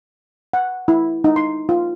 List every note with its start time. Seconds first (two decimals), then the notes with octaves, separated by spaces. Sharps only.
0.53 F#5
0.88 E4
1.24 D#4
1.36 C6
1.69 F4